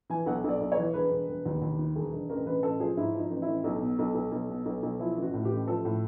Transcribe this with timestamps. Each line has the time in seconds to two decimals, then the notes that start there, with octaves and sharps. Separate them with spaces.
0.10 E3 G#5
0.26 B1 F#5
0.44 B1 D5
0.61 B1
0.72 C#5
0.77 E3
0.94 E1 B4
1.11 E1
1.29 E1
1.46 D#2
1.62 D#2
1.79 D#3
1.96 E1
2.13 E1
2.29 A1 A#4
2.46 A1 B4
2.63 A1 A4
2.80 F3 G#4
2.97 G#2 E4
3.15 F3 D#4
3.31 A1
3.42 E4
3.48 A1
3.64 B1 D#4
3.82 B2
3.99 B1
4.15 B1
4.32 B1
4.49 B2
4.66 B1
4.83 B1
4.99 F3 E4
5.17 A1 F#4
5.34 A2
5.45 G4
5.51 A1
5.67 F3 A4
5.85 A2